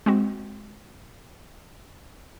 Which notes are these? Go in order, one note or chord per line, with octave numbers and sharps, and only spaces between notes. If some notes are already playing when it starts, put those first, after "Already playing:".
G#3 C4 F#4